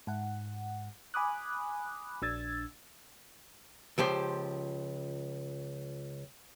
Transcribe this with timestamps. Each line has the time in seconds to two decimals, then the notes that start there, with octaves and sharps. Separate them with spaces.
0.07 G#2 F#5
1.14 G#5 B5 D6 D#6 F#6
2.22 A#1 D4 E6 G#6 A6
3.98 C#2 F3 G4 C5